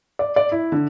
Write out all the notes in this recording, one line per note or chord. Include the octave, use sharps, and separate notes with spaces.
D5
D5
E4
D3